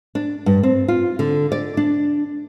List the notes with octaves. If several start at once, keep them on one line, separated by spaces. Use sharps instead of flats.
D4
G2
C4
F4
D3
D5
D4